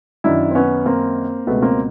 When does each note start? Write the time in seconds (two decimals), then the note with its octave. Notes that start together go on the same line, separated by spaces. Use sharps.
0.24 F#2 D#3 D4 E4
0.51 C4
0.55 B3 C#4
0.86 A#3 C4
1.47 C#2 B2 A3 B3
1.62 A#3 C4